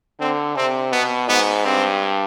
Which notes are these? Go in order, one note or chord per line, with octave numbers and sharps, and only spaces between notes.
D3 C4
C3 C4
B2 B3
G#2 B3
G2 C4